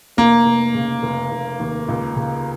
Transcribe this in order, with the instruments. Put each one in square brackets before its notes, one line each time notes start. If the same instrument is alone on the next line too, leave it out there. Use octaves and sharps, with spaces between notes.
[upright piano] F1 [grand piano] A#3
[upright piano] F1
C#3
F1
F1
D#2
C#2
C#3